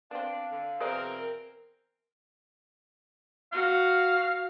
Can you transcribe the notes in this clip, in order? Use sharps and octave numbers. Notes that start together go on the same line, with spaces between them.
B3 C4 D4 F5
D3
B2 E3 C4 G#4 A#4 B4 D5
F#4 F5